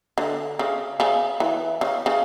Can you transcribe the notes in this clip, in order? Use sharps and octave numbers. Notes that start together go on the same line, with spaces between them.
D3
C#3
C#3
E3
C#3
C#3